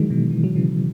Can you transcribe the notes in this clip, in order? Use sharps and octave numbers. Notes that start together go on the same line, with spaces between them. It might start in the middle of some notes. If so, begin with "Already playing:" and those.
Already playing: D#3 E3 F#3 G#3
B2 D#3
E3
F#3
C#3 E3